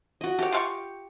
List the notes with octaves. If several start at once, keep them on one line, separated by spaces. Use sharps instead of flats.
F#4 D#5
A3 G4 C#5
F4 F5 C#6